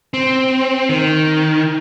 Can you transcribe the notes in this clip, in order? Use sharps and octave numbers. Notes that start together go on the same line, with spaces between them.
C4
D#3